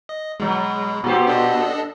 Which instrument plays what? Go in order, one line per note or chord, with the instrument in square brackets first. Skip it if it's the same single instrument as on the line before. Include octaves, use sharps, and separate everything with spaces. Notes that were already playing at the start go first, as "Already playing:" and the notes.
[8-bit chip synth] D#5
[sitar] B2 F#3 [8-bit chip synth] G#3
[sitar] A#2 G4 C5 [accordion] B3
[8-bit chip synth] D4 A4 D#5